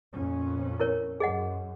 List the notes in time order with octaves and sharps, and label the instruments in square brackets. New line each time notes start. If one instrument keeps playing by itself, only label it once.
[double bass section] F2 A#2 C#4
[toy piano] E4 A#4 C#5
[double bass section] F#2 [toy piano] G#4 D#5 F#5